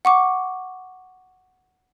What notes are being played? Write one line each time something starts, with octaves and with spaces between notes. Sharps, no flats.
F#5 C#6 D6